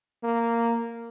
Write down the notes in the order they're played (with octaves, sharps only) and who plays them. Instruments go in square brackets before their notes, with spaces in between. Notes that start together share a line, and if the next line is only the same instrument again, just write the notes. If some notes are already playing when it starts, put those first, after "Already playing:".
[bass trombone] A#3